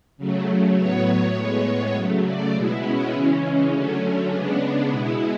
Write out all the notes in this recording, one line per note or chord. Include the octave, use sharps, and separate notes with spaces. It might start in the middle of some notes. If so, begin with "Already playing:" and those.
C#3 F#3 A3
A2 F#3 B3 C#5
A2 G#3 B3
C#3 F#3 A3
D5
B2 G#3 B3 E4
C#4
C#3 E3 G#3 C#4
D3 F#3 A3
C#3 G#3 B3 D4
B2 G#3 B3 E4